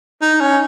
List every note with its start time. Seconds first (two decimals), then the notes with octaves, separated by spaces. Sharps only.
0.22 D#4
0.41 C#4